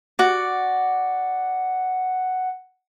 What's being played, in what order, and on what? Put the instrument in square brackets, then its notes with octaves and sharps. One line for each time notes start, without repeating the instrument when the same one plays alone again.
[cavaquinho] F#4 D5 [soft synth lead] F#5